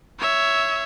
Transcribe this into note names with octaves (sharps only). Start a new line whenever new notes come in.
C#5 E5